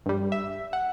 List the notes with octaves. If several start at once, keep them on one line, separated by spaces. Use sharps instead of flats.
G2 G3
E5
F#5